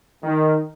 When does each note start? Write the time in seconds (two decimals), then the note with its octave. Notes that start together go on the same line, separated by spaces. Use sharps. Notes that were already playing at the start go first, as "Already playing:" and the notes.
0.23 D#3